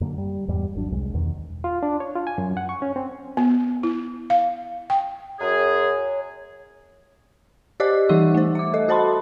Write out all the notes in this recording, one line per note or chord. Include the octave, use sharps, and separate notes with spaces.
F#2 D3 A#3
G3
E2 G#2 G3
G#1 F#3 D4
C2 G#3
E2 B2 D#3
F4
D4
C#5
F4
G#5
F#2
F#5
C#6
C#4
C4
B3
E4
F5
G5
F#2 G#4 C#5
G4 C5 D5 D#5 D6 F#6
E3 G3 D#4 F#5 C#6 E6
A3 C5
E5 D6
A4 D#5
F#4 A4 C5 A5 B5 C6